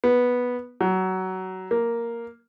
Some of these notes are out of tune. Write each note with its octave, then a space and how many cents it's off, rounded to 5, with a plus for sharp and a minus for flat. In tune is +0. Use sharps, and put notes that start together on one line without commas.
B3 -5
F#3 +20
A#3 +0